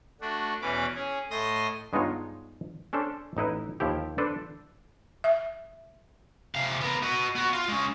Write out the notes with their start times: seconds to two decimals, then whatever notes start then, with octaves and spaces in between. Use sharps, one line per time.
0.21 A3 D4 F#4
0.62 E2 B2 E3 C#4 B5 D6
0.95 C#4 G#4
1.31 A2 A3 D#5 C6 D#6 A#6
1.93 G2 G#3 B3 D#4 F4 C#5
2.93 C#4 D4 A4 C5
3.37 A1 D#4 E4 B4
3.80 D#2 F3 E4 G4
4.18 D4 A4 B4 C5
5.24 E5
6.55 C3 F5
6.82 B3 A#4
7.04 F#4 D#5
7.36 B3 F#4
7.53 F4
7.68 G#3 C#4